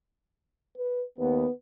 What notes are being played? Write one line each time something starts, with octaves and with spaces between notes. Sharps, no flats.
B4
D#2 B3 B4